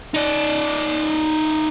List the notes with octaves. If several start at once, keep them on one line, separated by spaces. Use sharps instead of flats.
D#4 D5